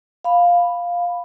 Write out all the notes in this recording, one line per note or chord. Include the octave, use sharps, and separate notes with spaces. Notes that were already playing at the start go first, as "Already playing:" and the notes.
F5 B5